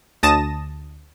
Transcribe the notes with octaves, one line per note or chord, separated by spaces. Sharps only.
D2 A5 D#6 A#6 E7